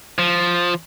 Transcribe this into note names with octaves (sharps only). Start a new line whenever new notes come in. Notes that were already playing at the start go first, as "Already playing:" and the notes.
F3